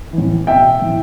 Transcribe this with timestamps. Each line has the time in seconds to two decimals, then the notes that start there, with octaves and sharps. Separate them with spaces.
0.13 E3
0.18 A2
0.47 B2 E5 G5
0.82 A2 E3